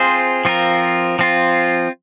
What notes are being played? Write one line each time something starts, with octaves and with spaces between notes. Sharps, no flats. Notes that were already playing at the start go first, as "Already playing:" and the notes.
Already playing: C4 F4 G#4 C5
F3 C4 F4 A#4
F3 C4 F4